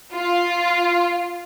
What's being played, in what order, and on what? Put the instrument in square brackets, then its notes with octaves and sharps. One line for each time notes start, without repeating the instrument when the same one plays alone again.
[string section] F4